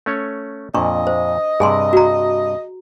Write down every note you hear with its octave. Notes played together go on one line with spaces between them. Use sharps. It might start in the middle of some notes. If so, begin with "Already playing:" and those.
A3 C#4 C#5
F2 A#2 D4 D#5 C#6
C5
G2 C3 G#4 G#5 C6
F#4 A#5